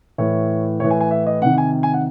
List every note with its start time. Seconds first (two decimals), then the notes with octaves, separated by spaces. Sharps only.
0.18 A2 E3 C#5
0.80 A2 E3 C#5
0.90 G#5
1.01 G#5
1.11 E5
1.27 D#5
1.42 C3 D#3 F#5
1.58 G#5
1.83 G#5
1.93 F#5